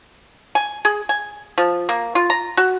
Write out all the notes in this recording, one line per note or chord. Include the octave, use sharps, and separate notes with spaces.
G#5
G#4
G#5
F3
A#3
F4
A#5
F#4